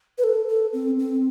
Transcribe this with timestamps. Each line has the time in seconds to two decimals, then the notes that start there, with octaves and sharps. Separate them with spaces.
0.18 B4
0.24 A4
0.49 A4
0.73 C4
0.99 C4